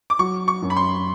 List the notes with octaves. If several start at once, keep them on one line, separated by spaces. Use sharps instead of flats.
D6
F#3 C#6
C#6
F#2
B5
C6